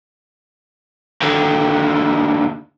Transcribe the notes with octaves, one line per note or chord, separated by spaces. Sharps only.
D#2 D3